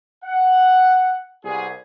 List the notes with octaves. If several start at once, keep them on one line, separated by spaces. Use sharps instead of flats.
F#5
C2 B3 G#4